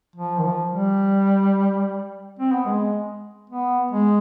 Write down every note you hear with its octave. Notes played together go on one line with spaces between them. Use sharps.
F3
D#3
F3
G3
C4
B3
G#3
B3
G#3